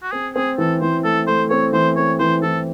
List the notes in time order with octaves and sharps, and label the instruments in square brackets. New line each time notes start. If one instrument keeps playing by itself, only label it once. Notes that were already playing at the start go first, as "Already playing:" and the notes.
[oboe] F#4
[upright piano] C4 [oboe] G#4
[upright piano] C4 [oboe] G#4
[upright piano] E3 [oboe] A4
[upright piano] E3 [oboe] C5
[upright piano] A3 [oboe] A4
[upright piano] A3 [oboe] C5
[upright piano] C4 [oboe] C#5
[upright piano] E3 [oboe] C5
[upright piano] C4 [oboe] C#5
[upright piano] E3 [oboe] C5
[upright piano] E3 [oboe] A4